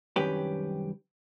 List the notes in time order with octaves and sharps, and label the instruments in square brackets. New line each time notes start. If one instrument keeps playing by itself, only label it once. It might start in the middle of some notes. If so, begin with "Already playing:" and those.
[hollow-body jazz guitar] C2 F#2 D#3 C#4 G4 B4